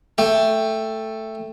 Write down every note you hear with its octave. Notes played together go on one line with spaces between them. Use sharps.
A3 G5